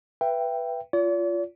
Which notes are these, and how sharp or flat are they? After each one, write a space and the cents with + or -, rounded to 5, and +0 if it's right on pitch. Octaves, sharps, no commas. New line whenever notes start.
B4 +0 E5 +25 G5 +0
F4 -10 D5 -45